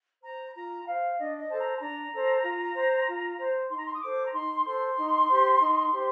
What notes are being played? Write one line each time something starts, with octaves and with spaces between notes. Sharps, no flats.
C5 A#5
F4 A#5
C5 F5
D4 D#5
D#5
A4 C5 A5
A#5
A5
D4 A#5
A4 C5
F4
C5
F4
C5
D#4 C6
A#5
C6
D#6
A4 C5 D6
A#5
D#4 C6
A4 C5 C6
D#4
G4 C5
D#4
G4 C5